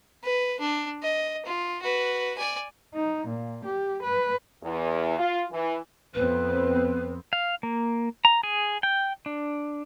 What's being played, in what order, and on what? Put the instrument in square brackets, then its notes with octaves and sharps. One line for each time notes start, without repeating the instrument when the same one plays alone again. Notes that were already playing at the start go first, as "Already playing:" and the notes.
[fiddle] B4
D4
D#5
F4
F#4 B4
D5 G#5
[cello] D#4
A#2
G4
B4
[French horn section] E2
F4
E3
[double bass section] F2 B3 C4 [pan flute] B4
[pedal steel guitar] F5
A#3
A#5
G#4
G5
D4